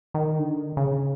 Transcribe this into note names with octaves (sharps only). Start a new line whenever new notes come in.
D#3
D3
C#3